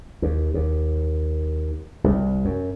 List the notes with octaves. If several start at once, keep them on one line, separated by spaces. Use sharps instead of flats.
D#2
D#2
C2
F#2